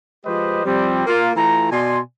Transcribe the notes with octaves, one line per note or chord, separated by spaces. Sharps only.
F3 G#3 G4 B4 C5 D#5
F3 G3 C4
A#3 F4
E3 A3 F4 A#5
B2 D5 G#5 C6